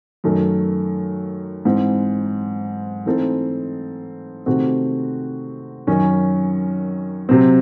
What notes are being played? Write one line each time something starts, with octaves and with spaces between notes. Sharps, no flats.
F#2 D#3 A3
G#2 E3 C4
E3 A3 C4 D#4 A4
C3 D#3 A3 C4 F#4
F#2 D#3 F#3 C#4
C3 F#3 C4